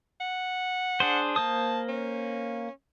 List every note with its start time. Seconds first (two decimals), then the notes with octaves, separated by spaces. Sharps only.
0.21 F#5
1.00 D4 G#4 C5
1.36 A#3 C5 A5 D#6
1.89 C#4